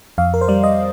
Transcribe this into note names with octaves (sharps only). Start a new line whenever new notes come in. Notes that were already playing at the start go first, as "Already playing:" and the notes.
F2 F5
A#4
C5
G3 D5
D#5